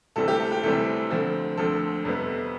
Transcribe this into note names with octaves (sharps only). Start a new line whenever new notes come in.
D2 C3 E3 G3 C4 A4
G4
A4
G4
D2 C3 E3 G3 C4 A4
D2 D3 F3 C4
D2 D3 F3 C4 A4
F2 C3 G3 B3